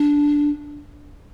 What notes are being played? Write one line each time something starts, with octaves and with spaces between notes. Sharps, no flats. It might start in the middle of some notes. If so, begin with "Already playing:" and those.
Already playing: D4